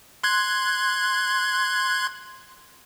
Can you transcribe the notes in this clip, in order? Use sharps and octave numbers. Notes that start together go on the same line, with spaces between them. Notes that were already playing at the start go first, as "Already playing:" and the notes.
C6 F#6 G#6